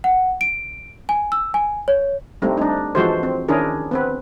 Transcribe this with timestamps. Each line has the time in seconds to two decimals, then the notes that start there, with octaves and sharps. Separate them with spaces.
0.04 F#5
0.41 D7
1.09 G#5
1.32 E6
1.54 G#5
1.88 C#5
2.42 G3 A3 C4 D#4
2.57 D4 D#4
2.95 E3 F3 G#3 F#4 A4 C5
3.23 C4
3.48 D#3 C#4 D4 E4 G#4 A#4
3.91 B3 C4 B4